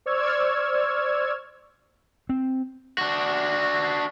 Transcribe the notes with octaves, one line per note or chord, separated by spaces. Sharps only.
C5 D5 C#6 E6 F6 G#6
C4
D4 F#4